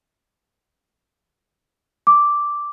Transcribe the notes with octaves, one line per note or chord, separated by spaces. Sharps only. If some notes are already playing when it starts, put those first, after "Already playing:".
D6